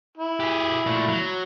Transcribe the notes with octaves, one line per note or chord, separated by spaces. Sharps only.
E4
G4 G#4
A#2 A3
F#3